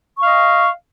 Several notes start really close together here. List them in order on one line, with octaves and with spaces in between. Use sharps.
C#6 F5 D#5